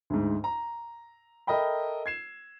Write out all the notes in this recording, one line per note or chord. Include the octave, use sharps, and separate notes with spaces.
D2 G#2
A#5
A4 A#4 D#5 E5 G5 B5
G#6 C7 E7